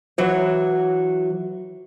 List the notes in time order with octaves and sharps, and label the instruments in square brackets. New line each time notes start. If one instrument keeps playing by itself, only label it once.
[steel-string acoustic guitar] E3 F#3 C#5